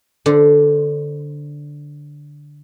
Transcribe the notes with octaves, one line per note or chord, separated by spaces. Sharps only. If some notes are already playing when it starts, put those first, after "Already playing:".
D3 C5